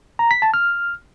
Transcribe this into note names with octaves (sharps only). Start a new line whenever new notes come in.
A#5
B6
A5
F6